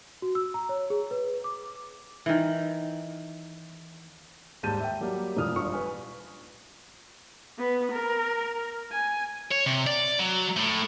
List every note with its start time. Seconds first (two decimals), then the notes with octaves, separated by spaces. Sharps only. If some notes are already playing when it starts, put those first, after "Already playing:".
0.22 F#4
0.35 E6
0.54 A#5
0.69 C#5
0.90 G#4
1.11 B4
1.44 D6
2.26 D#3 E3
4.63 D#2 G#2 G3 A5 G6 D#7
4.80 E5 G5
5.00 F#3 G3 A#3
5.37 E1 F3 D#6 F6
5.56 G1 F4 C#6
5.73 B4 G#5
7.59 B3
7.92 A#4
8.92 G#5
9.51 C#5
9.66 C3
9.87 D5
10.19 F#3
10.57 A2